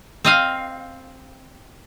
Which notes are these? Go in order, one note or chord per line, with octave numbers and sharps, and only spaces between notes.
C4 D#5 F5